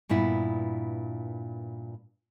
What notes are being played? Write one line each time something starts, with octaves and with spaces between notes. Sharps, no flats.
G2 A#2 B3 E4